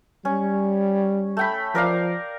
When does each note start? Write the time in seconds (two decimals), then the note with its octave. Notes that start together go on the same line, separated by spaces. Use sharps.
0.25 G3 C#4
1.37 A3 G5 B5
1.75 F3 A#4 D5 F5